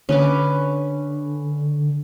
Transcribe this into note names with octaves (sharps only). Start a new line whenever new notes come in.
D3 C#4 B4 D6